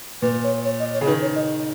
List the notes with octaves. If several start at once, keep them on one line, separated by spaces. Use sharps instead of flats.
A#2 B4
C#5
C#5
D#5
C#5
C#3
D#3 B4
C#5
D#5